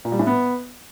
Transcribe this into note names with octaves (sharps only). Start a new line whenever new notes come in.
A#2
G3
A2
B3